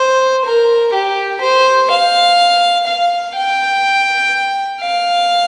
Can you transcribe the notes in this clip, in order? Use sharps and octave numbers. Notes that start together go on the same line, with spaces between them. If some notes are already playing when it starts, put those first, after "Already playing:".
Already playing: C5
A#4
G4
C5
F5
F5
G5
F5